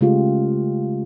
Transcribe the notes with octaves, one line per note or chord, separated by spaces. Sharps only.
C#3 G#3 A3 F4 G4